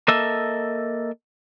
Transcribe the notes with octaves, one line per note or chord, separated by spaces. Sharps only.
A#3 A4 D#5 E5